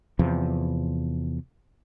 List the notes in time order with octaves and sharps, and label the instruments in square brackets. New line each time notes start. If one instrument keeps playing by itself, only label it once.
[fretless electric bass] E2 C3 F3